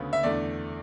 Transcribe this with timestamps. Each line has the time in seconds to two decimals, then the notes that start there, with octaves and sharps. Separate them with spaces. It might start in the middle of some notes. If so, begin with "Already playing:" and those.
Already playing: D2 C#3 B3
0.13 E5
0.23 E2 D3 A3 D5